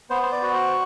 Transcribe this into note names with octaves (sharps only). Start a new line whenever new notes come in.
B3 C5
C5
D5
F#4
C5